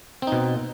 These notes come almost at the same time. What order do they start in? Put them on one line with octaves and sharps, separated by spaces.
C4 D#4 B2